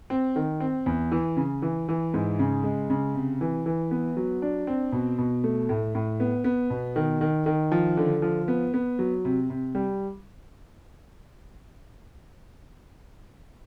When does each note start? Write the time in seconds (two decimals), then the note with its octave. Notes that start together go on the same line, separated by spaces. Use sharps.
0.10 C4
0.36 D#3
0.60 C4
0.86 E2
1.12 E3
1.37 C#3
1.62 E3
1.89 E3
2.14 G#2
2.39 C#3
2.64 G#3
2.90 C#3
3.15 C3
3.41 E3
3.66 E3
3.91 B3
4.17 F#3
4.42 D4
4.67 C4
4.92 B2
5.18 B2
5.44 A3
5.69 A2
5.95 A2
6.20 B3
6.44 B3
6.70 B2
6.96 D#3
7.21 D#3
7.46 D#3
7.72 F3
7.97 D3
8.22 F3
8.48 B3
8.74 B3
8.99 F#3
9.25 C3
9.50 C3
9.75 G3